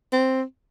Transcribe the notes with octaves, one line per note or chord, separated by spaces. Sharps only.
C4